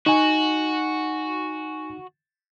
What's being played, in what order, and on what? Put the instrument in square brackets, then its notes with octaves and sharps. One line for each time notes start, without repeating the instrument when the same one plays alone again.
[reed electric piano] D#4 [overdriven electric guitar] F#4 [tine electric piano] G#5 C#6